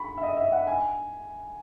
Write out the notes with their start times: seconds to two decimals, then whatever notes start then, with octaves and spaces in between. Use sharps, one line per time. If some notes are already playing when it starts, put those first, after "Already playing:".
Already playing: B5 C#6
0.17 E5
0.23 D#5
0.37 E5
0.52 F#5
0.67 G#5